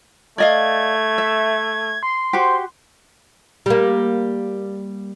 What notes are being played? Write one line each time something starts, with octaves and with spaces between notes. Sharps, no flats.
A3 D5 D#5 F5 G#6
E5
C6
F#4 G4 C5
G3 A#3